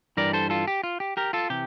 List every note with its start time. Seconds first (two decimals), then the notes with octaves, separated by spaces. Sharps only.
0.17 G2 E3 G3 A#4 D5
0.33 A4 C5
0.50 F4 A4
0.68 G4
0.84 F4
1.00 G4
1.17 G4 A#4
1.33 F4 A4
1.50 C3 E3 G4